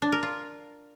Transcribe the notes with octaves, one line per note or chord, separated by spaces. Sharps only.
D4
A#4
F4